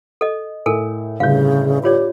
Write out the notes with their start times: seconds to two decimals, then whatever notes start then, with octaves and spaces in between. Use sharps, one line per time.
0.21 A4 D#5
0.66 A2 A4 A#4 G#5
1.20 G1 A2 C#3 F5 G6
1.84 F4 G4 C#5 D5